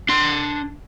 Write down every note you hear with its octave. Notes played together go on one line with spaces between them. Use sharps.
D4 C6